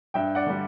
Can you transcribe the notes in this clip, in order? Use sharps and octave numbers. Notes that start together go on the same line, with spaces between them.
G2 E5 G5
D5 F#5
D3 G3